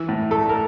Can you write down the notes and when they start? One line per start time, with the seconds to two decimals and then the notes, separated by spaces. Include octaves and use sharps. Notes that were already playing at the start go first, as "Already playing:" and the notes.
Already playing: E3
0.09 A2
0.31 A3 A4
0.49 A#4